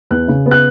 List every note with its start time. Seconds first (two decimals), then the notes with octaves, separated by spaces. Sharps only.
0.11 E2 F#6
0.28 C#3
0.46 B3
0.51 F#6